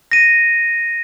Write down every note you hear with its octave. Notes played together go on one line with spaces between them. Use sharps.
A#6 D#7